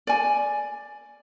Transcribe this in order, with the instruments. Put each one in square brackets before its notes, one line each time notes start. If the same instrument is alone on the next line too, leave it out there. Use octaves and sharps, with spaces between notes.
[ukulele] D5 G#5